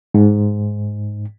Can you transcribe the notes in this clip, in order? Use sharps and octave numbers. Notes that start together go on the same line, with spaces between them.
G#2